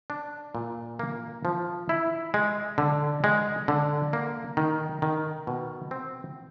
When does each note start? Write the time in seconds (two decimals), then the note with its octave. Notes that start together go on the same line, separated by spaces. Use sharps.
0.10 D4
0.55 A#2
0.99 A#3
1.45 F3
1.89 E4
2.34 G#3
2.78 D3
3.24 G#3
3.68 D3
4.13 A#3
4.57 D#3
5.02 D#3
5.47 B2
5.91 C4